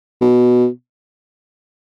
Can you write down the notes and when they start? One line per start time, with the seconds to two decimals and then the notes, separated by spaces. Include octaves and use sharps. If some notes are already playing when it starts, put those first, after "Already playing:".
0.21 B2